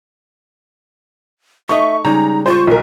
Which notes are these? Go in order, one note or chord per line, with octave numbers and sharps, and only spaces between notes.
A3 D#4 D#5 E5 C#6
C#3 G3 G#3 D#4 A#5
F4 C5 C#6
B1 A#4